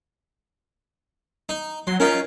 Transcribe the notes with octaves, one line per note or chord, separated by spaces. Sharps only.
D#4
F#3 C6
C#4 D#4 F4 A#4